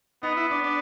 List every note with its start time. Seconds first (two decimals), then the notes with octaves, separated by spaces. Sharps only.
0.23 B3 D#4
0.37 E4
0.51 D4
0.64 D4